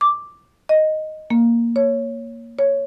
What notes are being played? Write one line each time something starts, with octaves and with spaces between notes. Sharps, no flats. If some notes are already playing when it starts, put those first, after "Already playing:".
D6
D#5
A#3
C#5
C#5